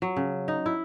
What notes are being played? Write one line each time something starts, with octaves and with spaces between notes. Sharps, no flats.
F#3
C#3
D#4
E4